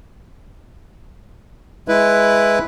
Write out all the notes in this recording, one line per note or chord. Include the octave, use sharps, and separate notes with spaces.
G#3 E4 B4